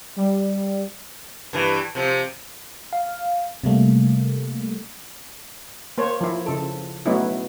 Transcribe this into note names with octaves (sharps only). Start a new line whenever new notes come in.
G3
G2 E3
C3 F3
F5
C3 G3 A3 A#3
A#3 C5 C#5
F3 E4
C#3 A4
F#3 A3 B3 C#4 D#4 E4